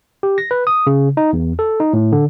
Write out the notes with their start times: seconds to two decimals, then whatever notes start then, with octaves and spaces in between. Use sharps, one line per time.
0.23 G4
0.38 A#6
0.51 B4
0.67 D#6
0.87 C#3
1.17 D#4
1.33 E2
1.59 A4
1.80 D#4
1.93 A2
2.12 D3